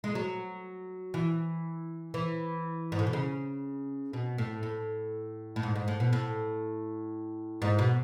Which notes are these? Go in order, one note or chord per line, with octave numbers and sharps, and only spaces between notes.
G#3
F#3
E3
E3
G#2
A2
B2
C#3
B2
A2
A2
A2
G#2
G#2
A2
B2
A2
G#2
B2